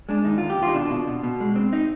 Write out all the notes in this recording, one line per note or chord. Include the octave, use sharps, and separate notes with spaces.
G#3 D4
D#2 D#4
D#2 F4
G4
D#2 F4
D#4
B2 D4
B2
B2
B2
G#3
C4
D#4